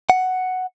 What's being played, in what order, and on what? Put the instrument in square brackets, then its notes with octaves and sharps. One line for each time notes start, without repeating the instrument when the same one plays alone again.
[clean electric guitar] F#5